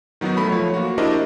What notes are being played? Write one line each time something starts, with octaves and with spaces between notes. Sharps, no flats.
D#3 F#3 B3 D#4 F#4
F#3 A3 B5
F3 A3 C#5
A#3 F#4
D4 E4 G4 A#4 C5 D#5